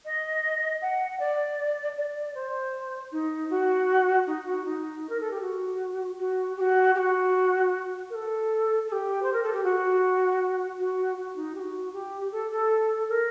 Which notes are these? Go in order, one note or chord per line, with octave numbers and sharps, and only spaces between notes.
D#5
F#5
D5
D5
C5
D#4
F#4
D#4
F#4
D#4
A#4
A4
G4
F#4
F#4
G4
F#4
G4
F#4
A#4
A4
A4
G4
C5
A#4
A4
G4
F#4
F#4
F#4
D#4
G4
F#4
G4
A4
A4
A#4